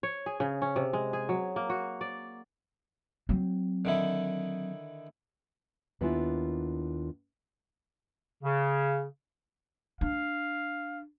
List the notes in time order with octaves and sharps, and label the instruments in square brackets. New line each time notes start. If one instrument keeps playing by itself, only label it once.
[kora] C#5
G#4
C#3
C#4
C3
G#3
G#4
F#3
A#3
F#4
D5
[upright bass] F#3 C4
[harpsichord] D3 D#3 E4
[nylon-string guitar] D#2 B3 D4 E4 F4 G#5
[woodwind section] C#3
[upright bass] D4 [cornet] F5